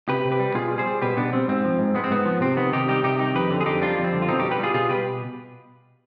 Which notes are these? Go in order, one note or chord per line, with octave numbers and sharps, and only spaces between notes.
C3 G4 B4
C3
G4 B4
G3
B2 F4 G#4
G3
G#4 C5
G3
B2 G4 B4
B2 B3 D4
G3 C4
G#2 C4
F3
G#2
G#3 B3
C4
G#2 B3
F3
C3 C4
D#3 B3
C3 D#4 G4
G3 D#4 G4
C3 D#4 G4
D#3 D#4 G4
F2 G4 B4
D3
G#4
F2 D#4 G4
G3 D4 F4
F2
C4
D3
F4
B2 C4 D#4
G3 D#4 G4
G4 B4
G3 F4 G#4
B2 F4 G#4
B2 G4 B4